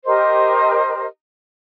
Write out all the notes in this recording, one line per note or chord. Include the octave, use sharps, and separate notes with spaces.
G4 A#4 C5 D#5